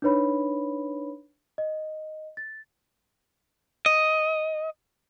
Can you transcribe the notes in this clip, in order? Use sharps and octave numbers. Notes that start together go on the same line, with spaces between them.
D4 D#4 B4 C#5 B5
D#5
A6
D#5